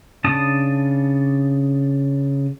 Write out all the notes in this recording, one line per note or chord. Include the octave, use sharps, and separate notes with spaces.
C#3 D4 A5 D#6